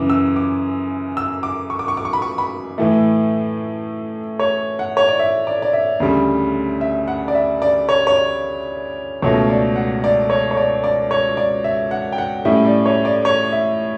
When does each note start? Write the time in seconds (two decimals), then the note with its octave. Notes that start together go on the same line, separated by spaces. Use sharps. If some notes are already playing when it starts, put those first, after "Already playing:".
Already playing: F#2 C#3 E3 D6
0.10 E6
0.36 D6
1.17 E6
1.43 D6
1.70 C#6
1.79 D6
1.88 C#6
1.97 D6
2.05 C#6
2.13 B5
2.22 C#6
2.38 B5
2.78 A2 E3 A3
4.39 C#5
4.79 F#5
4.97 C#5
5.08 D5
5.19 E5
5.47 D5
5.62 D5
5.73 E5
6.00 D2 C#3 G3
6.81 E5
7.08 F#5
7.28 D5
7.35 E5
7.62 D5
7.89 C#5
8.07 C#5
8.15 D5
9.22 C#2 B2 A3 C#5
9.49 D5
9.76 F#5
10.04 D5
10.30 C#5
10.51 C#5
10.57 D5
10.84 D5
11.11 C#5
11.37 D5
11.64 E5
11.91 F#5
12.12 G5
12.18 F#5
12.45 A2 G3 C#4 E4 E5
12.65 D5
12.86 C#5
13.05 D5
13.25 C#5
13.52 E5